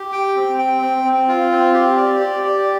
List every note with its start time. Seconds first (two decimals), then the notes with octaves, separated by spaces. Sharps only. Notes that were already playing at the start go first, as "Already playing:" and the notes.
Already playing: G4
0.12 G5
0.36 C4
0.59 G5
0.82 C4
1.04 C4
1.28 F4
1.51 C4
1.73 G4
1.97 D5
2.20 G4
2.44 D5